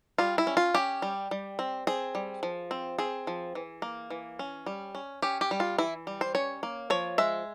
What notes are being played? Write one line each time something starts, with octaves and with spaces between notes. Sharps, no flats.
G3 F4
E4
C#4
F4
C#4 G4
G3
G3
C4
C4 G#4
G3
F3
C4
C4 G#4
F3
E3
A#3
E3
C#4
G3
C#4
C#4 G4
G4
G3
F4
E3 E4
G3
C5
C#4 C#5
A#3
F3 C#5
G#3 E5